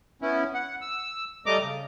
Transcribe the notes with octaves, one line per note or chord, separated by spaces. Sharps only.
B3 C#4 E4
F#5
E6
G3 A3 D#5 A#5 D6
C#3